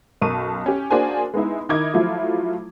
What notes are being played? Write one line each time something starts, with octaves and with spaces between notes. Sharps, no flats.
B1 F#2 A#4 A5 C#6 D#7
C#4 G4
A#3 D4 F#4 G#4 C5 G#5
G#3 B3 D#4 E4
D#3 D#4 E4 D6 G#6
F3 F#3 A3 E4 F4